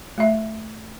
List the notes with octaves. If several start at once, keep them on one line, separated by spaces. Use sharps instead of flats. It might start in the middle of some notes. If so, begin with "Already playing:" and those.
A3 E5